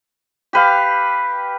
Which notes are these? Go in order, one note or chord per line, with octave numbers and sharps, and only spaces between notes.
G4 B4 F5